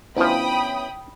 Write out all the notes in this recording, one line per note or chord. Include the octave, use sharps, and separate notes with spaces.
D2 F3 B3 C#4 E4 G5 B5 D#6